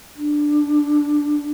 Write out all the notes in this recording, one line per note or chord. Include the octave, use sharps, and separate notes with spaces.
D4